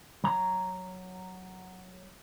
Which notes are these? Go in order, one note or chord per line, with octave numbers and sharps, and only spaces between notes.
F#3 A#5